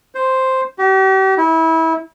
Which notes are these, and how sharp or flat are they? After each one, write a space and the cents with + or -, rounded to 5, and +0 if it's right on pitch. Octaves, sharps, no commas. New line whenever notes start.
C5 +0
G4 -40
E4 -25